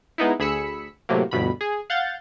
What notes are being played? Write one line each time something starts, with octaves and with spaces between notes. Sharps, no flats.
G#3 B3 D#4 E4
D2 G#4 B5 E6 B6 C#7
A2 C3 F#3 A#3
G1 D2 G2 B2 B5
G#4
F5 F#5 G6 A6